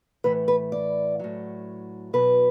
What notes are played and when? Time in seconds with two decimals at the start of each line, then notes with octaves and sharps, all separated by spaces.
0.24 A2 E3 B4
0.48 B4
0.72 D5
1.19 A2 F#3
2.13 B2 F#3 B4